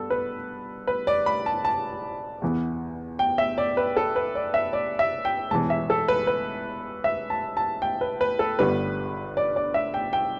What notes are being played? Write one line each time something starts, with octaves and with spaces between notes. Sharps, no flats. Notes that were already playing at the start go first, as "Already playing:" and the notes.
Already playing: G2 B3 A4
B4
B4
D5
B5
A5
A5
E2 E3 B3
G5
E5
D5
B4
A4
B4
D5
E5
D5
E5
G5
E1 E2 E3 A5
E5
A4
B4
B4
E5
A5
A5
G5
B4
B4
A4
G1 G2 D3 G3 B4
D5
D5
E5
G5
G5